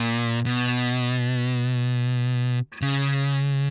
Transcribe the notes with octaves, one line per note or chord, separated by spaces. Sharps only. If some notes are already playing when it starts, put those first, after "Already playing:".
Already playing: A#2
B2
C#3